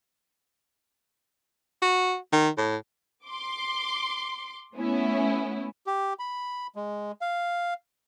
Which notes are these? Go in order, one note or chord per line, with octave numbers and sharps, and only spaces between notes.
F#4
D#3
A2
C6 D6
A3 B3 C#4 E4
G4
B5
G#3
F5